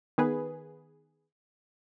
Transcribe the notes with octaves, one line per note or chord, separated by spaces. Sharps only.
D#3 B3 G#4 B4